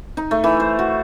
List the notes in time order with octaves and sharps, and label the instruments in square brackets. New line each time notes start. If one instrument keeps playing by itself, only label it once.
[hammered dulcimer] D#4
A3
E3
C5
F#4